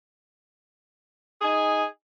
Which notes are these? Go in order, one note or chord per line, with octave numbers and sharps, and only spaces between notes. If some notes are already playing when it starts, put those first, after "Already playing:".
D#4 G#4 G#5